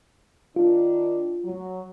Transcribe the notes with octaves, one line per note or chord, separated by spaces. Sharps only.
D#3 D4 F4
F#3